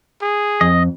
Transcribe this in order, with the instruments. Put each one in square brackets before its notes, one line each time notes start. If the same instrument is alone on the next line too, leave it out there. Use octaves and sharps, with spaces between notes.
[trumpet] G#4
[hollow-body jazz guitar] F2 [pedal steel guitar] D#5